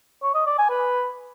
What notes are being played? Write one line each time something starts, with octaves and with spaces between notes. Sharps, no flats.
C#5
D#5
D5
G#5
B4